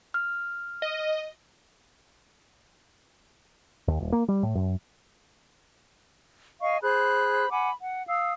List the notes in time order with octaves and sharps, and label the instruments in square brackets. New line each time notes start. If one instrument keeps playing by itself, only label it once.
[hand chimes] F6
[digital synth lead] D#5
[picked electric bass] D#2
D#1
A#3
G3
A2
F#2
[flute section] D#5 F5 G#5 C#6
G#4 C5 B5 F#6
F#5 G#5 B5 D6
F#5
F5 D#6 E6